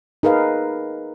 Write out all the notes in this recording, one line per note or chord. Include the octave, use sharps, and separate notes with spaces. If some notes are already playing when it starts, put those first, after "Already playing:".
D#4 G#4 A#4 B4 F5